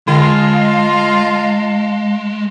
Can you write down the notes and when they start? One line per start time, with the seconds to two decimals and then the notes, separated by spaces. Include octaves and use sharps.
0.08 D3 G#3 F4 D#5 F5 G5 A5